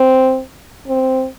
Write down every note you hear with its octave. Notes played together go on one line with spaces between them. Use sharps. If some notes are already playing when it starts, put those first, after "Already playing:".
Already playing: C4
C4